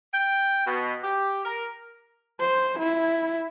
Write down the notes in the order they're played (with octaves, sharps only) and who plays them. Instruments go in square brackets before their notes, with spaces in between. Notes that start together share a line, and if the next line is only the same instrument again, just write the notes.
[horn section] G5
B2
G4
A#4
[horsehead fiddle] C5
E4